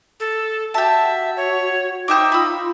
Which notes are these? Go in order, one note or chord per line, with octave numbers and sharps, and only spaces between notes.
A4
F#4 G4 E5 A5
C#5
D#4 C5 E5 G5 D6
F4 B5 E6